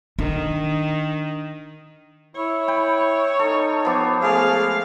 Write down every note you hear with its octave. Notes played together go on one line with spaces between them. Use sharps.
D#3 D4
E4 C#5
G5 B5
D#4 A4
F3 B3 D6
G#3 A3 G#4 F5